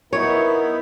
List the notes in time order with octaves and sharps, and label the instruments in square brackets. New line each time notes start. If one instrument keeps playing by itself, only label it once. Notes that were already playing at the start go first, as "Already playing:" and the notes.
[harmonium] B3 D#4 E4 [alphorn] A#4 [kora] C#5